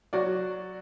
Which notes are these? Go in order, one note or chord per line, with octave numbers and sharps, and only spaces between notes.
F#3 F#4 D5